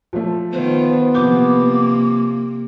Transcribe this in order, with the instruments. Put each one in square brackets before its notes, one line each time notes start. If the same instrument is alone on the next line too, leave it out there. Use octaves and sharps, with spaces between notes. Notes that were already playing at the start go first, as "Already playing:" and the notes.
[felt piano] F3 A3
[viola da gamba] D#3 F4 [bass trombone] B3 [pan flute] C5
[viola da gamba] C3 A#3 [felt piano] F3 G6 [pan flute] D6